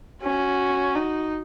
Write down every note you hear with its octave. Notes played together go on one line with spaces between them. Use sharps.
C#4 F#4
D#4